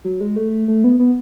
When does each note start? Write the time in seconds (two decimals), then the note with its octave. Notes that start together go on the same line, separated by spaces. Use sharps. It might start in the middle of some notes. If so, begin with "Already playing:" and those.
0.04 F#3
0.21 G#3
0.36 A3
0.68 A3
0.84 B3
0.99 B3